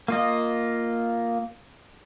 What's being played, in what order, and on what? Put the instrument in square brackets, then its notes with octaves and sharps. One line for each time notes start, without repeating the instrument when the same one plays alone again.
[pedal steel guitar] A#3 F4 D#5